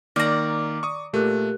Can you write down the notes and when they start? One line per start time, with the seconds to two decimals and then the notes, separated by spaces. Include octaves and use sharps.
0.16 D#3 A#3 D5 A#5 F6
0.83 C#6 D#6
1.13 A#2 A3 G4 A#4 F#6